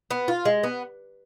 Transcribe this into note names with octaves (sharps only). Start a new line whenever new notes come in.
B3
F4
G#3
B3